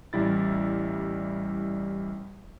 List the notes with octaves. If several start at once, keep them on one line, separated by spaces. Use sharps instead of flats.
A1 G3 E4 A6